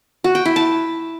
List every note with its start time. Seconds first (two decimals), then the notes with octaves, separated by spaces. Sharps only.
0.24 F#4
0.35 G5
0.45 E4
0.56 A5